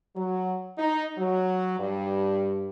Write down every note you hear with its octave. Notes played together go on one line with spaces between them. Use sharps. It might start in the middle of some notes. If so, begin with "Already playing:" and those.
F#3
D#4
F#3
G2